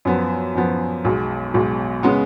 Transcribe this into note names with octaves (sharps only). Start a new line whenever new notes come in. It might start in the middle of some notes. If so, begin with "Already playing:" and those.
F#2 F3 B3
F#2 F3 B3
B1 B2 G#3
B1 B2 G#3
C#3 G#3 B3